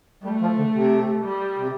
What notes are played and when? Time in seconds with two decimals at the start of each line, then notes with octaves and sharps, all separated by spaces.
0.24 G3 A3
0.41 F3
0.57 D3
0.75 C3
1.24 G3
1.58 C3